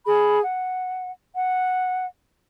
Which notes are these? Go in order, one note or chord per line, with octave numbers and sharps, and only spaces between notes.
G#4 B5
F#5
F#5